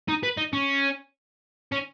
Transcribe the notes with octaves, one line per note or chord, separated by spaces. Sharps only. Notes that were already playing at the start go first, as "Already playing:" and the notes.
D#4
B4
D#4
C#4
C#4